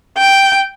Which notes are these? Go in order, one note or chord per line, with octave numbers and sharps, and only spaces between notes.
G5